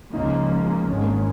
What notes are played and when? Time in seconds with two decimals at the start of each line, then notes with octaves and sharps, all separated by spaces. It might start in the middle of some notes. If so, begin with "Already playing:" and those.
0.13 C#2 C#3 F3 A#3 D#4
0.88 G#1 G#2 D#3 G#3 C#4
1.02 A#3
1.14 C#4